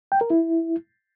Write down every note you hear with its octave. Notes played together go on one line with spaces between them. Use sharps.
G5
A#4
E4